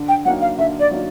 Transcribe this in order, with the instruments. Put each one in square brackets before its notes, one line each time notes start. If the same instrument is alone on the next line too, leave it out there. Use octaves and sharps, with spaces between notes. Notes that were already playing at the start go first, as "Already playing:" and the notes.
Already playing: [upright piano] D3
[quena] G5
[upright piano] F#3 A#3 D#4 [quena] F#5
[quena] F5
[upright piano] D3 [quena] E5
[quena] D5
[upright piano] F#3 A#3 D#4